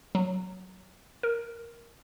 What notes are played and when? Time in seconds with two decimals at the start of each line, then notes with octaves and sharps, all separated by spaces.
0.15 F#3
1.23 A#4